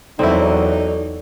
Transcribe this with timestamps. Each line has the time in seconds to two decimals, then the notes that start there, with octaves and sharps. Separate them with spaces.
0.19 E2 F#3 C4 D#4 E4 A4 D5